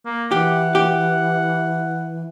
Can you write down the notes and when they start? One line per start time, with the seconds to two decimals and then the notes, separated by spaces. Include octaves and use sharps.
0.05 A#3
0.31 E3 G4 F#5
0.75 G4